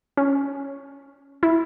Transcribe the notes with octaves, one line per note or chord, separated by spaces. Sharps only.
C#4
E4